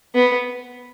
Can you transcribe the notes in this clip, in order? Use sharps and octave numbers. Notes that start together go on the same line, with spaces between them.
B3